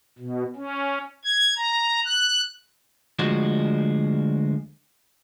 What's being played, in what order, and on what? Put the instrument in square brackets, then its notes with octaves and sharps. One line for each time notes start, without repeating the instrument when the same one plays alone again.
[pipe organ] B2
C#4
G#6
A#5
F#6
[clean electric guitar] D2 F3 G#3 F#4